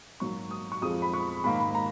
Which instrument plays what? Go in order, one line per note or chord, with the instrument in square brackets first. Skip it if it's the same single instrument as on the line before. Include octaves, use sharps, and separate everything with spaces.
[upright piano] G#2 F#3 A#3 C#6
D#6
C#6
F2 F3 G#3 D#6
B5
C#6
G#2 D#3 A#3 B5
B5
A#5